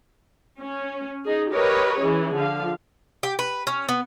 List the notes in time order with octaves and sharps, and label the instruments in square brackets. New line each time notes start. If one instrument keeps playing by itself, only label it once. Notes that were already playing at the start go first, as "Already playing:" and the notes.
[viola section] C#4
D#4 G#4
G4 A#4 B4 C#5 D#5
E3 C#4 G#4
D3 F3 F5
[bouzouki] G4
B4
C#4
B3